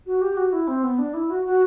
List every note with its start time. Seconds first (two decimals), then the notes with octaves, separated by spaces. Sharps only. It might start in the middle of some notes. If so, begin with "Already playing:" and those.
0.06 F#4
0.21 G4
0.37 F#4
0.53 E4
0.68 C4
0.84 B3
0.99 D4
1.14 E4
1.30 F#4
1.46 F#4